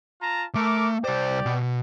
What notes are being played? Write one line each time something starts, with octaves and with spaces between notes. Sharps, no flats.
F4 A5 A#5
A3 A#4 D6
C2 G4 C5 D5
B2